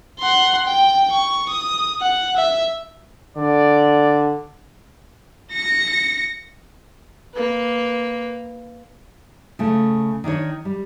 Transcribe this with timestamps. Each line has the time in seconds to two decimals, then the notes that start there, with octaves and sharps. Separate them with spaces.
0.20 F#5 C6
0.66 G5
1.11 C#6
1.49 D#6
2.01 F#5
2.36 E5
3.37 D3 D5
5.52 A#6 C#7
7.34 A#3 B4
9.59 C#3 A3
10.24 D#3 D4 D#4 C#5
10.65 G3